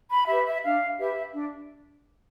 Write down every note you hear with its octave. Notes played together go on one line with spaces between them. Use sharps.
B5
G4 B4 E5
E5
D4 F5
G4 B4 E5
D4